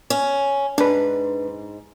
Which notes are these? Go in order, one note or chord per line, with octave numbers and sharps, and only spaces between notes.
C#4
G#2 D4 B4